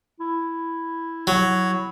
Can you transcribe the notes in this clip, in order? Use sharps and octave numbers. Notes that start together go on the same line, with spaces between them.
E4
F#3